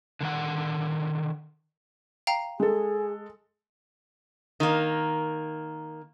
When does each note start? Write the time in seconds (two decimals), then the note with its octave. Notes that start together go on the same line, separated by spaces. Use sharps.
0.21 D3 D#3 F#5
2.27 F5 G5 A#5
2.60 G#3 G#4 A4
4.60 D#3 A#3